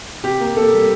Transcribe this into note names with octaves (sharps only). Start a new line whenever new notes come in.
C3 G4
A#3
A#3 A4
G3